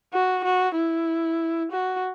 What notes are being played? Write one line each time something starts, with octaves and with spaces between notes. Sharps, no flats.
F#4
F#4
E4
F#4